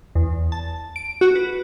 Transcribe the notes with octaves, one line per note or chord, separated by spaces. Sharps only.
E2
A5
D7
F#4
B4